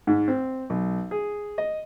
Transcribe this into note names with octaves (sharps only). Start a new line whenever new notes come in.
G#2
C4
B1
G#4
D#5